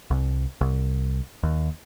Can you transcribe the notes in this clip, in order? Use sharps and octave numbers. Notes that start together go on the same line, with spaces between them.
C2
C2
D#2